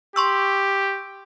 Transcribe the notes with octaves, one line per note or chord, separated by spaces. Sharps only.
G4 C6 C#6 E6